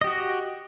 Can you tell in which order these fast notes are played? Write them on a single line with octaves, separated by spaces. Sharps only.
D#5 G4 F#4